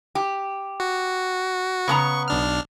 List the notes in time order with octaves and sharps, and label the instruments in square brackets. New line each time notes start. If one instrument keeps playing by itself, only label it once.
[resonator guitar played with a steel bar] G4
[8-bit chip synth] F#4
[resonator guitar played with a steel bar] C#3 B3 A#5 [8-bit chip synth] C#6
[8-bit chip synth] B1 D4 F6